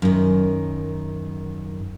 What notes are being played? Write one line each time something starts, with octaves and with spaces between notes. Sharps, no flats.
F#2 D#3